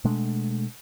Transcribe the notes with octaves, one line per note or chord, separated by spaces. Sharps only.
B2 G#3 A3 D4